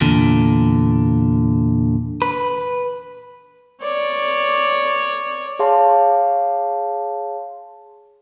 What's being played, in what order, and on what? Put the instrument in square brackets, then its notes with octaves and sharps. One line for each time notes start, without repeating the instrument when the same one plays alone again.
[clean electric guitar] E2 A#2 D3
B4
[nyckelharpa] C#5 D5
[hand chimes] G#4 C#5 F5 A5 C6